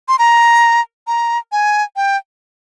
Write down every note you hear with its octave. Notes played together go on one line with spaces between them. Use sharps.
C6
A#5
A#5
G#5
G5